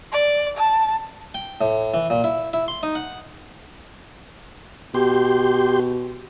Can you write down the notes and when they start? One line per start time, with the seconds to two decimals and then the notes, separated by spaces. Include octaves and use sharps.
0.12 D5
0.57 A5
1.34 G5
1.61 A2
1.94 E3
2.10 A#2
2.24 E4
2.53 E4
2.68 C6
2.83 D#4
2.95 F#5
4.94 B2 G4 C6